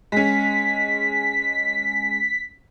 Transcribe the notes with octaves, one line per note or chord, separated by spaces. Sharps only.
G#3 C#4 B6